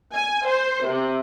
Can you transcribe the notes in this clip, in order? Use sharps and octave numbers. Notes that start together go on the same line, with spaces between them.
G#5
C5
C3